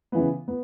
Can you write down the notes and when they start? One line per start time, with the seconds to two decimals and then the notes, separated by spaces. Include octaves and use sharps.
0.12 C#3 E3 B3
0.48 B3